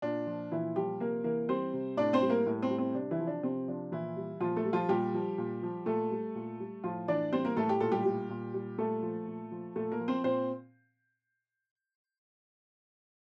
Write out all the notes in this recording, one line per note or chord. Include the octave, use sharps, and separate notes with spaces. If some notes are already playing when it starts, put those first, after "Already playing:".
A#2 D4
F3
A#2 E3 E4
F3 G3 G4
C3 A#3 A#4
E3 A#3 A#4
G3 C4 C5
C3
A2 D4 D5
C4 C5
G3
A#3 A#4
A2
C4
G3
C4
C3 D4
E3 E4
F3
D4
C3 C4
F3 D4
A#2 E3 E4
G3
A#2 F3 F4
A3 A4
G3
F3 F4
A#2 G3 G4
F3
A#2
F3
A#2 A3 A4
G3
A#2
G3
A2 F3 F4
E3 D4 D5
G3 C4 C5
A#3 A#4
A2 A3 A4
G4
A#2 A4
G3 G4
G3
A#2
G3
A#2 A3 A4
F3
A#2
F3
A#2 A3 A4
A#3 A#4
F3
C4 C5
A#2 C4 C5